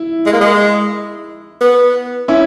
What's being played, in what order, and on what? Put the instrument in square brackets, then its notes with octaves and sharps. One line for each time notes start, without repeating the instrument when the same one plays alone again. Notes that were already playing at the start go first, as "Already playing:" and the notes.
Already playing: [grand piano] E4
[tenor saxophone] G#3
A#3
G#3
B3
[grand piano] C#4 E4